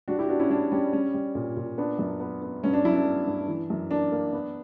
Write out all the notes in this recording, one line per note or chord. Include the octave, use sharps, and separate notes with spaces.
G3 D4 F#4
E4 G4
B3 D4 F#4
C#4 E4
G3 D4
G3 C#4
G3 C#4
G3
A#2
A#2
B3 D4
F#2
B3
B3
G2 C#4
D4
F#3 C#4 E4
D4
B3
G2
E3
F#2
A#3 D4
A#3
B3